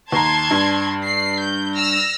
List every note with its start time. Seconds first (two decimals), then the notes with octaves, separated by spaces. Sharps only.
0.12 D#2 A5 A#5 C6 G#6
0.51 G2
1.07 C7
1.43 G6
1.77 E6 F6 A#6